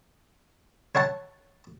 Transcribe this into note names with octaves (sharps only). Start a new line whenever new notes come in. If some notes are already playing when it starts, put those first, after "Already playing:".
C#5 E5 F#5 A5